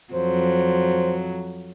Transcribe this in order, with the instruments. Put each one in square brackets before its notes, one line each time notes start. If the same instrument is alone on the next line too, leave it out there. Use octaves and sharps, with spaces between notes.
[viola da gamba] F2 F#3 [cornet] C5